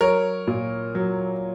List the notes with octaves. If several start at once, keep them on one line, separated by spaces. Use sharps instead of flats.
F#3 A#4 C#5
A#2
F#3